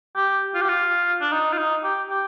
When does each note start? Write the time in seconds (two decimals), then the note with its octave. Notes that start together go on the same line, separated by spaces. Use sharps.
0.16 G4
0.55 F4
0.61 G4
0.69 F4
1.21 D4
1.32 D#4
1.53 F4
1.58 D#4
1.84 G4
2.10 G4